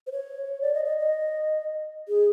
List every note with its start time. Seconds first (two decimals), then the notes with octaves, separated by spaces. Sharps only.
0.07 C5
0.12 C#5
0.62 D5
0.74 D#5
0.85 D#5
0.98 D#5
2.08 G#4